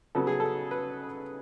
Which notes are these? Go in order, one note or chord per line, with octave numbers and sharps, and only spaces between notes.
C#3 F#3 B3 A4
G#4
A4
B4